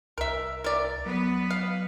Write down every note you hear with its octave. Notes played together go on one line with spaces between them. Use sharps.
C2 A#4 E5
A#4 D5
F#3 B3 B4
F5